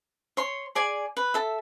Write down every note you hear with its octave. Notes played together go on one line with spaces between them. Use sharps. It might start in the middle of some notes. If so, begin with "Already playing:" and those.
C#5 C6
G#4 D5 G#5
B4
A4 E5